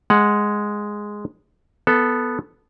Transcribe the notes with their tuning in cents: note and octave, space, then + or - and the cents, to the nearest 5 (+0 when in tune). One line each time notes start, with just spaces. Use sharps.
G#3 +0 F#5 +0
B3 +0 A4 +0